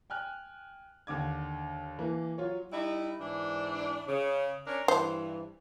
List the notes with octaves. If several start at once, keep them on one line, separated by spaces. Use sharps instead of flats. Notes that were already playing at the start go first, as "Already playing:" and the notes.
G5 G#5 F6 F#6
D#2 D3 D6 G#6
E3 A#3
F#3 F4 C#5
G3 D#4 E4
G#2 E3 D4
C#3
C#4 D4 A#4
G2 E3 C5